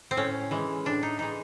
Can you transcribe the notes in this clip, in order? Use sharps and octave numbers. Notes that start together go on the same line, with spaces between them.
C4
A2 C#4
E3 G#3
A2 D4
D#4
E3 G#3 D#4